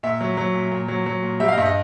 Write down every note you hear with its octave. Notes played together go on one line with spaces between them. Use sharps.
A#2 E5
F#3
F#3
A#2
A#2
F#3
F#3
A#2
G3 E5
F5
D#5
G2 E5
D#5